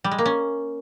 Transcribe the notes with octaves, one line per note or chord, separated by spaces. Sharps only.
G3
G#3
A#3
C#4